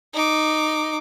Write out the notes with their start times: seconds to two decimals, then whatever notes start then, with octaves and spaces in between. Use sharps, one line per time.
0.14 D#4 D6